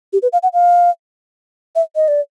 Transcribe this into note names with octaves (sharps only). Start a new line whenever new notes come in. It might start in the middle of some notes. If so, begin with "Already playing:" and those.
G4
B4
F5
F#5
F5
E5
D#5
D5